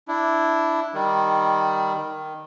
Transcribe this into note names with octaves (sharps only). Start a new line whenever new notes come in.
D4 E4
D#3 G3
D#3